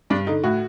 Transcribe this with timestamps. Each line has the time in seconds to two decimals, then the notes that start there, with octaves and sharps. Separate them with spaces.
0.10 G2 D4
0.27 D3 D#4
0.44 A2 F#4